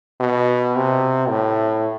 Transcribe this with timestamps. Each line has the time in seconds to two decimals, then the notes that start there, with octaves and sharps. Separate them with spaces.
0.20 B2
0.76 C3
1.29 A2